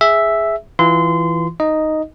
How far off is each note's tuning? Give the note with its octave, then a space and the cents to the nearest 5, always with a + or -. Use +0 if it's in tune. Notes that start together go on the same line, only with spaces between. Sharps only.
G#4 +0 E5 +0
E3 +0 F4 -5 C6 -25
D#4 +0 D#5 +0